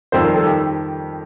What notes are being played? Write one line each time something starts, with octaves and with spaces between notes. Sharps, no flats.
F2 D#3 G3 C5
A#4
A4
D#3 G4